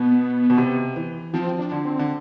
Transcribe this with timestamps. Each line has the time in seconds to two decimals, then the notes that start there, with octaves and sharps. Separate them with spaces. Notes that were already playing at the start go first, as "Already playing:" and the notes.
Already playing: B2 B3
0.50 B2
0.57 C3
0.96 E3
1.33 F3 C4
1.59 D4
1.72 D3
1.85 C4
1.99 D3